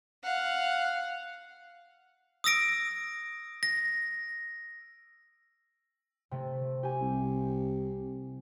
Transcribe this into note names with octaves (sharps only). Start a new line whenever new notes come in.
F5 F#5
D#6 E6 A#6 D7
A#6
C3 A3
G4 G#5
C2